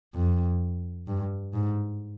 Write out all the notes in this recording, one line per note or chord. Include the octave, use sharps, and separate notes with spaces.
F2
G2
G#2